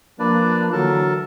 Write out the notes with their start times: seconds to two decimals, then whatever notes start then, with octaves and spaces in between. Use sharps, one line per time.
0.19 F3 A#3 D4 B4 D5
0.72 D3 E3 F#3 A4 A#4 A5